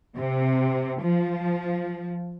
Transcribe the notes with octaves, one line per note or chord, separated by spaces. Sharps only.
C3
F3